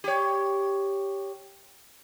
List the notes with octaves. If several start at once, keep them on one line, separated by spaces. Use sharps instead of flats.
G4 C#5